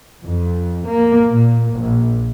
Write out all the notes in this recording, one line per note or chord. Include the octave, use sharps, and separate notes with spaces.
F2
A#3
A#2
A#1